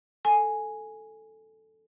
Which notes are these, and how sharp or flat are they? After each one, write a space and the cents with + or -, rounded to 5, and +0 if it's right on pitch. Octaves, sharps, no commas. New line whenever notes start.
A4 +0 G#5 +0